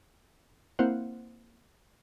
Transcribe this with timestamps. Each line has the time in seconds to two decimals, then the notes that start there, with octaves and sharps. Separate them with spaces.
0.79 A#3 C4 E4 C5 F5 F#5